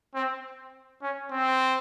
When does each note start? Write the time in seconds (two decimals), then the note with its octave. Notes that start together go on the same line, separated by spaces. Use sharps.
0.15 C4
1.02 C#4
1.31 C4